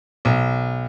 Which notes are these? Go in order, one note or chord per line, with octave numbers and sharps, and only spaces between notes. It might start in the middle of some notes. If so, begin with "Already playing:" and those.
B1